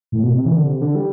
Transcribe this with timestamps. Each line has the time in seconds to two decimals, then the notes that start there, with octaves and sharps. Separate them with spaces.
0.12 A2
0.23 B2
0.35 C3
0.45 E3
0.55 D3
0.66 C3
0.81 D3
0.95 G3